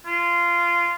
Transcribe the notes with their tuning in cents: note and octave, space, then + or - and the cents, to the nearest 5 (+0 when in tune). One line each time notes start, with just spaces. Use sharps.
F4 -15